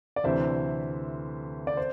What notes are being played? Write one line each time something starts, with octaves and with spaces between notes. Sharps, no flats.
D5
D2 C3 E3 C5 E5
D5
C5